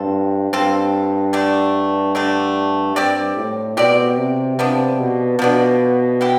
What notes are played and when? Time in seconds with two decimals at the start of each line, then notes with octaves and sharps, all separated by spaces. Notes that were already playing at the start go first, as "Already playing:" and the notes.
Already playing: G2 C4 F4 A4
0.52 G2 C4 F4 A4
1.33 D3 A3 D4
2.15 D3 A3 D4
2.96 G2 C4 G4 D5
3.37 A2
3.77 B2 C4 G4 D5
4.17 C3
4.58 C3 F3 B3 D4
4.99 B2
5.39 B2 F3 B3 D4
6.21 B3 E4 G4